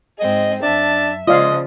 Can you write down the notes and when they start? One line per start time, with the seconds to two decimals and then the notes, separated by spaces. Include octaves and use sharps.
0.20 G#2 C4 G#4 D#5
0.63 F#2 D4 E5 A5
1.28 C#3 F3 G#3 F4 D5 D#5 F5